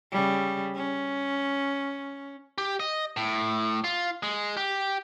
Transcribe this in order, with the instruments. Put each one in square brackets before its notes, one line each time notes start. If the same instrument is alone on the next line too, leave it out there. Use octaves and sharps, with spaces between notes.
[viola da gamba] C#3 G3
C#4
[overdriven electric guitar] G4
D#5
A2
F4
G#3
G4